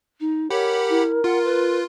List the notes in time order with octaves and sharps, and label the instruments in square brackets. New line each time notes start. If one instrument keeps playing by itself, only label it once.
[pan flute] D#4
[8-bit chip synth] G4 F#5 B5 [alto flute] A#4 [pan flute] C#5
[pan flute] E4
[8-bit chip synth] F4 [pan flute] F#5
[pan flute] B4